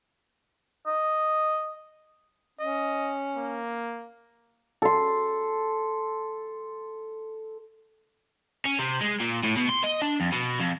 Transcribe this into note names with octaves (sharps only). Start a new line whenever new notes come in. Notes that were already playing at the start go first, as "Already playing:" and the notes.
D#5
C#4 D#5
A#3
A4 C6
C#4
C3
G#3
A#2
A2
B2
C6
D#5
D4
F2
B2
F2